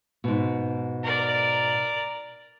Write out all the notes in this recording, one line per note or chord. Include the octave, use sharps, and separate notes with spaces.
G#2 B2
A#4 D5